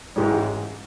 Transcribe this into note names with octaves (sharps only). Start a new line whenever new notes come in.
A1 G#2 E3 G#3